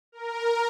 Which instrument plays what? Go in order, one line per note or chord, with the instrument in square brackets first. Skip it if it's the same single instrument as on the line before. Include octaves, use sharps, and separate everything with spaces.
[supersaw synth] A#4